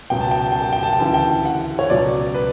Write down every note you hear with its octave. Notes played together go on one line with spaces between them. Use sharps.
C#2 B2 F#3 G5
A5
G5
A5
G5
A5
G5
A5
G5
D2 C#3 E3 A5
G5
F#5
C#5
C#2 B2 F#3 D5
B4